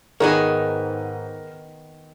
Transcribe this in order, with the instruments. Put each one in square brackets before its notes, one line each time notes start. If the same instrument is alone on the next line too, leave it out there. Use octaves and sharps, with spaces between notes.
[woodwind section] G#2 [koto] D#3 B3 G#5 [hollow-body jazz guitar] D#4 G#4 C#5 [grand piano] A#4